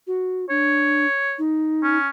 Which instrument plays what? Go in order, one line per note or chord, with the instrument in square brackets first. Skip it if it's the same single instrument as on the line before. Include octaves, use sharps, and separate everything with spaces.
[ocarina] F#4
[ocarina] D4 [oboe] C#5
[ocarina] D#4
[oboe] C#4